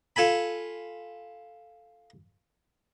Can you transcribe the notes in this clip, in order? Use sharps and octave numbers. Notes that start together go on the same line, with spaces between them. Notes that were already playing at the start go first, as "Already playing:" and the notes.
F4 A4 G#5 B5